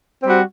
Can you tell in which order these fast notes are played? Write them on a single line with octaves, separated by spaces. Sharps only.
C4 G3 F#4